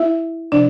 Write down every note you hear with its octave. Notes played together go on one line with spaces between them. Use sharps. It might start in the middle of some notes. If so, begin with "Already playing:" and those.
Already playing: E4 E5
C3 F3 D4 D5